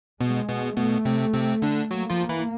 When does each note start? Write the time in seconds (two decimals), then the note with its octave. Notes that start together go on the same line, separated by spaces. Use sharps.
0.20 B2 G#3 B3
0.49 B2 B3
0.77 B2 A3 B3
1.05 C3 C4
1.34 C3 C4
1.62 D3 D4
1.91 F#3 A#3 F#4
2.10 F3 F4
2.29 E3 E4